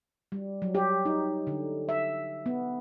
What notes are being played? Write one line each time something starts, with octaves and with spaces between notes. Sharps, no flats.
G3
F#3
G4
D#4
D3
E5
B3